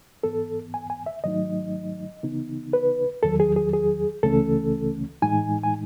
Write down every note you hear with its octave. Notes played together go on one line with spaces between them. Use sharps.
G#2 E3 B3 A4
G#5
G#5
E5
G#2 D#3 F#3 A3 D#4 D#5
C#3 E3 B3 D#4
B4
E2 D#3 F#3 A4
G#4
G#4
G#4
C#2 C#3 E3 A3 C#4 A4
A2 E3 G#3 D#4 G#5
G#5